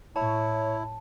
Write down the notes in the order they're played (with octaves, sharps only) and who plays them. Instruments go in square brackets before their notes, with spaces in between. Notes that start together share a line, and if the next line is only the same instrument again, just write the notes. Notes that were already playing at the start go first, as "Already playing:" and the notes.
[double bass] A2 [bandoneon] E4 [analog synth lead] C#5 [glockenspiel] A5